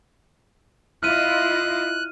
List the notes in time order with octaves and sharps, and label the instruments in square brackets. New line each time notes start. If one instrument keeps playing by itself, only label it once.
[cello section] E4 F4 D#5 [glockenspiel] F6 D#7 [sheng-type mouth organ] F#6